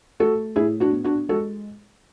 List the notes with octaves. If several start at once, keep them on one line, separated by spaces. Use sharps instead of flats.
A3 F#4 A4
A2 E4 G#4
D4 F#4
B3
D4 F#4
G#3 F#4 A4